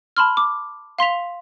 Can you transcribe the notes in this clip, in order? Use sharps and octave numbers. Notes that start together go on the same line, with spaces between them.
A5 B5 C6 F6
D6
F5 C6 B6 F7